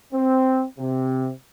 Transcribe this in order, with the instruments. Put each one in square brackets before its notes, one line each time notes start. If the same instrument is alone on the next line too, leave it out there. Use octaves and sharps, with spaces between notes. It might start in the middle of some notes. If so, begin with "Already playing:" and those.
[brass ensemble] C4
C3